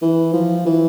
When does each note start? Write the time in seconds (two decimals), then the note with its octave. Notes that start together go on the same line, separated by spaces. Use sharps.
0.02 E3
0.33 F3
0.66 E3